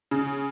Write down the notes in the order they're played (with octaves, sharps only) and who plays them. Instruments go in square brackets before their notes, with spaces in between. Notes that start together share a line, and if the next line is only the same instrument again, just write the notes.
[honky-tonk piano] C#3